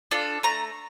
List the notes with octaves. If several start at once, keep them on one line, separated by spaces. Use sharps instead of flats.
D4 F4 A4
A3 A#5